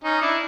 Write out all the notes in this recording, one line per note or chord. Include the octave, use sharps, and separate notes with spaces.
C#4 D#4
D4 E4